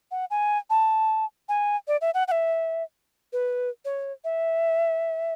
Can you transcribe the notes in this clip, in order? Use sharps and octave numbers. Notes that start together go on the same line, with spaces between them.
F#5
G#5
A5
G#5
D5
E5
F#5
F#5
E5
B4
C#5
E5